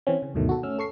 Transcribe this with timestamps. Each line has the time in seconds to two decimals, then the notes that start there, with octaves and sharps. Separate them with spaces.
0.07 E3 C4 C#4
0.22 C#3
0.34 D2 G2 B2 D#3 A3
0.49 F#4 A4
0.63 A3 C#4 E6 F6
0.79 A4 C#6 C7